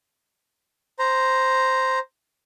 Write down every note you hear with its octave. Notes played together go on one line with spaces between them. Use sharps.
C5 A#5